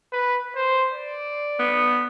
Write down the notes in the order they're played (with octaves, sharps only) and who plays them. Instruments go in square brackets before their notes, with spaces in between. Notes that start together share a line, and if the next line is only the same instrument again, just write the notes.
[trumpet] B4
C5
D5
[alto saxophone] B3